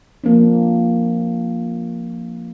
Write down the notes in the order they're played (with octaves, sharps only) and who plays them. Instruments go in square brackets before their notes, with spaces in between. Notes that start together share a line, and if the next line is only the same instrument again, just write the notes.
[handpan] F3 A#3 C4 D4